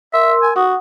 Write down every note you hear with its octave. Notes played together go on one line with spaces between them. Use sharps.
A#4 E5 C6 E6
G#5
F#4 F#5 D#6